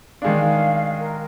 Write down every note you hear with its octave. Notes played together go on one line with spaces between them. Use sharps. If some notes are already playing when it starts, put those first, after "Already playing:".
D#3 G#3 D4 F5
A#4